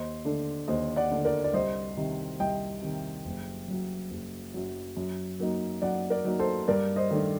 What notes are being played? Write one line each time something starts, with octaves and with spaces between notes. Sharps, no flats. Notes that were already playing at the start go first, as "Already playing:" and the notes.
Already playing: D#2 C5 D#5
D3 A3 D4
D#2 C5 D#5
D5 F#5
D3 A3 D4
A#4 D5
D5
C2 C5 D#5
C3 D#3
C2 D#5 G5
C3 D#3
F#1
F#2 F#3
F#1
F#2 F#3
F#2
F#3 A#3 D#4
F#2 D5 F#5
A#4 D5
F#3 A#3 D#4
A4 C5
G2 A#4 D5
C5 D#5
D#3 A3 D4